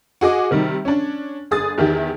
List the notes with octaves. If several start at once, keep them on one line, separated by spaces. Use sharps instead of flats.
F#4 G#4 D#5 D6
C3 D#3 G3
C#4 D4
G1 G#4 D#6 A6
E2 D#3 E4 G4